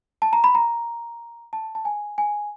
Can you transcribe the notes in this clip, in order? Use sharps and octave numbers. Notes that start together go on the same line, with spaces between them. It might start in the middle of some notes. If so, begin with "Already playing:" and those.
A5
A#5
B5
A#5
A5
A5
G#5
G#5